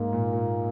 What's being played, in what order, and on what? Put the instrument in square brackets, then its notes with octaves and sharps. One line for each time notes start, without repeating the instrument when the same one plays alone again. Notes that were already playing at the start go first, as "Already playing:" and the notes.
Already playing: [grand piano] G#2 [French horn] A#3
[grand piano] A#2
A#2